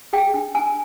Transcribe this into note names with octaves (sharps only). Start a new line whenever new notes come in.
G#4 G5
D4
D4 G#5